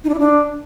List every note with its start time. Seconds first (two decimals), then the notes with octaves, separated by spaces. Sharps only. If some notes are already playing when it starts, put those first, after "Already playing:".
0.04 D#4
0.09 D4
0.14 E4
0.19 D4